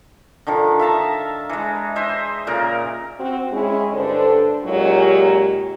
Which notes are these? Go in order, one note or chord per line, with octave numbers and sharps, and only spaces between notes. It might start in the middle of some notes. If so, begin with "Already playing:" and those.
D3 D#3 F3
E5 F5 A5 A#5
E3 G#3
C5 D#5 E5
A#2 C#3 A#4
C4 F#4
G#3 C#4 E4
G2 D3 D4 A4 C5
A#2 F#3 G#3 C#4 D#4 G4